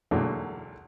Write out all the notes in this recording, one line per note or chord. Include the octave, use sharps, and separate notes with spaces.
B1 E2 D3 F#3 G#3 A#3